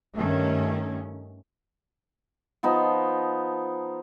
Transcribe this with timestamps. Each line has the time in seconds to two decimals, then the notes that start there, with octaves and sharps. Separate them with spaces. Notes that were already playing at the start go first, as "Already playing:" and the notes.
0.16 G2 D#3 A3 C#4
2.63 F3 B3 D#4 A5